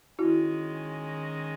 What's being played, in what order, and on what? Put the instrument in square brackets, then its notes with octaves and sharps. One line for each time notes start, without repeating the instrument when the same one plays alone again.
[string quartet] D#3 G#3 C#4 [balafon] E4 F#4